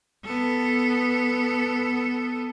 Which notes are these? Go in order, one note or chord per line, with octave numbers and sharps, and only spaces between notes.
B3 A4